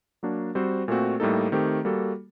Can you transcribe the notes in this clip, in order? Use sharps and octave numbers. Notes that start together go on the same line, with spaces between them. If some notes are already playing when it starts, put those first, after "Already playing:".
F#3 A#3 D4 F#4
G3 C4 F#4 C5
A#2 A3 C4 F#4
A2 G3 A#3 D#4 A4
D#3 A3 C4 G4
G3 A#3 F#4 A4